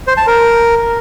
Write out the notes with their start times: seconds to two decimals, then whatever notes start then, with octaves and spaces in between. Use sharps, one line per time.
0.07 C5
0.17 A5
0.27 A#4